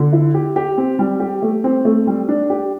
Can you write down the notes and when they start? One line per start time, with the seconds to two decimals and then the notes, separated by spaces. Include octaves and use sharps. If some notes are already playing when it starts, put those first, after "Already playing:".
Already playing: D3
0.13 E4
0.34 G4
0.56 G4
0.78 C4
0.99 G3
1.20 G4
1.42 A3
1.64 C4
1.85 A3
2.07 G3
2.28 D4
2.50 G4